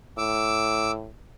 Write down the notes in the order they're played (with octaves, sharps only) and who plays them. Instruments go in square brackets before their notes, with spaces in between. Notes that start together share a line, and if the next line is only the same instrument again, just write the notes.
[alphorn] A2 [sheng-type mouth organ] D6 E6